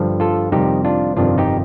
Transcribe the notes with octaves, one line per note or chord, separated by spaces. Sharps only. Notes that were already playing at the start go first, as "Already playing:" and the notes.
Already playing: G2 D3 F3
F4 A4
F2 C3 D#3 G3 D#4 G4
D4 F4
G1 F2 C3 D#3 D4 F4
D#4 G4